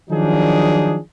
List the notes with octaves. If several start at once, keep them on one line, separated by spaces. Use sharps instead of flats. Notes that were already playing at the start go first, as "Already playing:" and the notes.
D#3 F3 F#3 D4 D#4 G#4